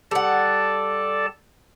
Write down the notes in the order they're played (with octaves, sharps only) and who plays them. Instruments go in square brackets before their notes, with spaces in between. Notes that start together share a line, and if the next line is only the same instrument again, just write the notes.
[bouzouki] G3 F#5 [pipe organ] A4 D5 A5